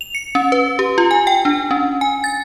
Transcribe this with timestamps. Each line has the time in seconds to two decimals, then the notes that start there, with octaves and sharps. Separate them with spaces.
0.01 F7
0.15 C#7
0.35 C#4
0.52 B4
0.79 G4
0.98 F4
1.11 G#5
1.27 G5
1.45 D4
1.71 C#4
2.01 G#5
2.24 A6